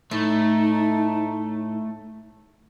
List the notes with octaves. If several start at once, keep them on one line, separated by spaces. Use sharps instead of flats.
A2 A3 D#4